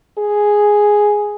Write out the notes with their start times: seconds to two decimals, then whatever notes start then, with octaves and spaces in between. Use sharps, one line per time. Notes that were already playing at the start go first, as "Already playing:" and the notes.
0.18 G#4